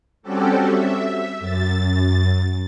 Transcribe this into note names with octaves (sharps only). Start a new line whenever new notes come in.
G3 C4 C#4 F#4 G4 A4
E5
F#2 A6